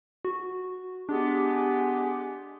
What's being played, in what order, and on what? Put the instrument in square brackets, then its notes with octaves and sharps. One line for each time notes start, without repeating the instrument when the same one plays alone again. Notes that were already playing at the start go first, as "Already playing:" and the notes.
[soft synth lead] F#4
[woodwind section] G#3 B3 G4 [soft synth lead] D4